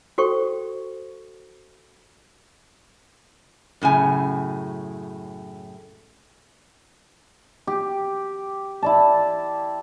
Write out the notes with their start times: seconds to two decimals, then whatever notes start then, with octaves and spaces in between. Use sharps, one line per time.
0.18 F#4 A4 C5 G5 C#6
3.82 F#2 A2 C#3 G#5
7.67 G4
8.82 E4 D5 A5